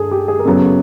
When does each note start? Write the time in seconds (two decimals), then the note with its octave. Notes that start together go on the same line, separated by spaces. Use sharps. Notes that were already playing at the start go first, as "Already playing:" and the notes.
Already playing: G2 G#4 A4
0.11 G4
0.28 G#4
0.39 A#4
0.45 F#2 C#3 F#3 B3 A4